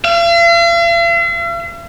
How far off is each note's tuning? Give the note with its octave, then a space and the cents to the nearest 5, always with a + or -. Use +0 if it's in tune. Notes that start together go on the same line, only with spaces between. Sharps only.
F5 -45